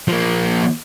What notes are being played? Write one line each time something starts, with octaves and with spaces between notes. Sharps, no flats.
F3 A#3